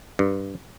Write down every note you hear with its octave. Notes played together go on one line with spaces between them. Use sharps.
G2